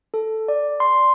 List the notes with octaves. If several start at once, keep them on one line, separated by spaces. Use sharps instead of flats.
A4
D5
C6